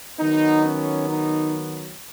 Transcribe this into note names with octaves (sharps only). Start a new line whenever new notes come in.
D#3 F#3 B3 D#4
C#4
D#4